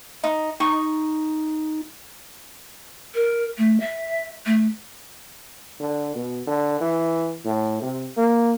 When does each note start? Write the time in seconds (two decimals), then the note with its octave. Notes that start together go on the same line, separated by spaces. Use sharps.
0.24 D#4
0.60 D#4 C#6
3.15 A#4
3.58 A3
3.80 E5
4.46 A3
5.80 D3
6.15 B2
6.47 D3
6.81 E3
7.45 A2
7.81 C3
8.17 A#3